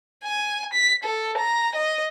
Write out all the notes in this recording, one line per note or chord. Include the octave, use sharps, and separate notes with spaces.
G#5
B6
A4
A#5
D#5